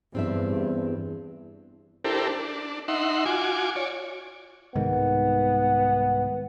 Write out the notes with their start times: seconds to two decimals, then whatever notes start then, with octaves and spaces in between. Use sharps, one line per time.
0.15 E2 G2 C4 D4 E5
2.05 D4 E4 G4 A4 A#4 C5
2.29 D4
2.88 D#4 E5 F#5 C6
3.26 F4 F#4 G#5 D6
3.76 C#5 D5
4.75 C2 G#2 D#3 B3